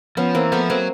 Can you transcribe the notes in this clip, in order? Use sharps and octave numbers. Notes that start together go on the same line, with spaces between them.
F3 B3 C#4
E3 A#3 C4
F3 A3 B3
F#3 A#3 C4